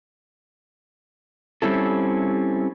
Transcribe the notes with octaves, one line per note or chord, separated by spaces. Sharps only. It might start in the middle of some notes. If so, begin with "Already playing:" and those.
G3 C4 C#4 E4 A4